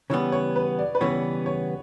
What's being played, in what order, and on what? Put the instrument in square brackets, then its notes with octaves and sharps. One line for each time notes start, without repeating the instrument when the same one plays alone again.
[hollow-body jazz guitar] C#3 E3 G3 B3 [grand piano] C#5
[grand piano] C#5
B4
D5
B4
[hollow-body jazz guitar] C#3 E3 G3 B3 [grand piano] C#5
[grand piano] C#5